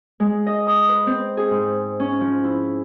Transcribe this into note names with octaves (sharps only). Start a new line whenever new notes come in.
G#3
D#5
D#6
B4
C4
G#4
G#2
C#4
F3
E4